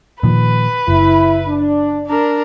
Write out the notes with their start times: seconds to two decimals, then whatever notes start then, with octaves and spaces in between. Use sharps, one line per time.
0.23 A#2 D#3 F3 B4
0.88 F#1 E4
1.48 D4
2.07 D4 A#4